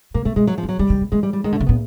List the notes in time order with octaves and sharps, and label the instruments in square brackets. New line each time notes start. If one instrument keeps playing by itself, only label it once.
[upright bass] B2 [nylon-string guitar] A#3
[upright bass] B2 [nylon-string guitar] A3
[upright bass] B2 [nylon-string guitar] G#3
[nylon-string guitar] F#3
F3
[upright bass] E3
[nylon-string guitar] F#3
[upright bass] D#3 [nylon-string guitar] G3
[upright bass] D#3
D#3
[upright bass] E3 [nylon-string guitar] G#3
[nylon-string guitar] G3
G3
[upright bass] D#3 [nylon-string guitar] G#3
[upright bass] D3
[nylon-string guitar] A3
[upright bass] C#3
[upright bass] A#2 [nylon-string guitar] B3